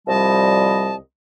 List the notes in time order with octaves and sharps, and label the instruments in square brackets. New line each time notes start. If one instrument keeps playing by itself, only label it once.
[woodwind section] C2 F3 G3 D#5 A5